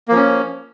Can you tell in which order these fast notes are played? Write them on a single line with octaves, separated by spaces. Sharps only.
A#3 F3 C#4